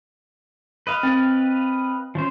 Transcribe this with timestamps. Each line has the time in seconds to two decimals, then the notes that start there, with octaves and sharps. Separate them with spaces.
0.87 B4 D#5 F5
1.03 C4
2.15 F3 C#4 C5